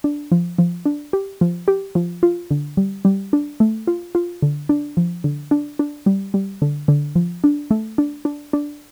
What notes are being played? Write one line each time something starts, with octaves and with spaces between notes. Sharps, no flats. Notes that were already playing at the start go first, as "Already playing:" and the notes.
D4
F3
F3
D4
G4
F3
G4
F3
F4
D3
G3
G3
D4
A3
F4
F4
D3
D4
F3
D3
D4
D4
G3
G3
D3
D3
F3
D4
A3
D4
D4
D4